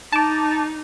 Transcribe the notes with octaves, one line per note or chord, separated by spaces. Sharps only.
D#4 A5 D6